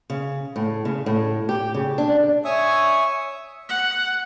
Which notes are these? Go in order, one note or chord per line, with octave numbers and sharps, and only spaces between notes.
C#3
A2
C#3
A2
G4
C#3
D4
C#5 E5 G#5 C#6 D#6
F#5